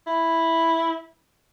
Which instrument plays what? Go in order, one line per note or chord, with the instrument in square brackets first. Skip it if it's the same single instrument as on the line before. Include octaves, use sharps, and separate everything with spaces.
[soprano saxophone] E4